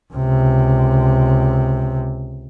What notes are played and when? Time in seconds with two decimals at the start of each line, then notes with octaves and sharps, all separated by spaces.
0.14 C#2 C3